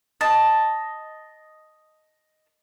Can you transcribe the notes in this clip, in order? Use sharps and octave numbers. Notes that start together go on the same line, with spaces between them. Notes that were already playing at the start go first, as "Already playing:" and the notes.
D#5 A5